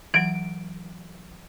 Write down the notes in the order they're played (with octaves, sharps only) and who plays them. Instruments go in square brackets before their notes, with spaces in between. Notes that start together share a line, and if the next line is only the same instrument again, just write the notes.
[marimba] E3 F#3 [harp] D7